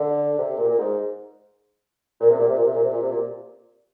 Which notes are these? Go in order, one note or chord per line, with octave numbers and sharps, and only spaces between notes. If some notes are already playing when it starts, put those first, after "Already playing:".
Already playing: D3
C3
A#2
A#2
G#2
A#2
C3
A#2
C3
A#2
C3
A#2
C3
A#2
C3
A#2